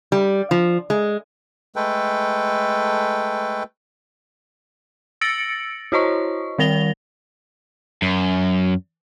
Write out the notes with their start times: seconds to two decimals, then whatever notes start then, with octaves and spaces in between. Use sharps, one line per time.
0.12 G3
0.51 F3
0.90 G#3
1.76 G#3 A3 A4 B4 G5
5.21 E6 A6 A#6 C#7 D7 F#7
5.92 E4 F#4 C5 C#5 D#5 C#6
6.59 D#3 G3 A#4 A#6 F7 G7
8.02 F#2